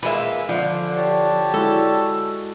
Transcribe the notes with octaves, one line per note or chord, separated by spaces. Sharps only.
A#2 G#3 A#3 B4 E5
D3 F3
G4 C#5 A5
G#3 E4 F#4 A4